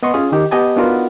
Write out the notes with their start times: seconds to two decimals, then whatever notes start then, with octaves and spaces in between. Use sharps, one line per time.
0.03 B3 D#5 C6 C#6
0.14 C#4 F4 G#4 C#5
0.32 D#3 D#4 G4
0.51 B3 G4 D#5 G#5 A5
0.76 B3 D4 D#4 F4 F#4 A#4